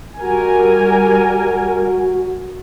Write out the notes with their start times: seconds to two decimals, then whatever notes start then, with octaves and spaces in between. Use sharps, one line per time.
0.21 G3 F#4 A#4 G#5